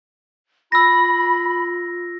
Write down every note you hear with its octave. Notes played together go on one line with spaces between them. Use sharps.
F4 B5 E6 A#6